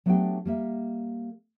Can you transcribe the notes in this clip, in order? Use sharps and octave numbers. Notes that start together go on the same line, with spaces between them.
F#3 A3 B3 D4 G4 G5
G3 A#3 E5